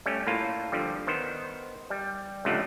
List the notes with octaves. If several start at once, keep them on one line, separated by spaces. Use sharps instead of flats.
G3 A3 C#4
A2 A#3 F4
D3 F3 G3
D#3 B3 C5
G3
C#2 G2 C3 F3 A3 F#5